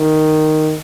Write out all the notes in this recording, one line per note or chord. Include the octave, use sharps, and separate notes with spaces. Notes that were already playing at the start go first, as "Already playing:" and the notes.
Already playing: D#3